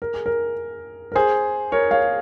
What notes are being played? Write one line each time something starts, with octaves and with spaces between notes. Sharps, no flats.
A#4
G#4
A#4
A#4
G#4 C5
A#4 C#5
C#5 F5